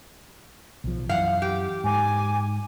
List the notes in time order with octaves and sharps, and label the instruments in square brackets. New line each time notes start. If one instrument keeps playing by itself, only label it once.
[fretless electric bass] B1 F3
[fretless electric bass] F#2 E3 [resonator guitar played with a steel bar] F5 F#5
[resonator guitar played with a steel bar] G4
[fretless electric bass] G#2 [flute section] G#5 D6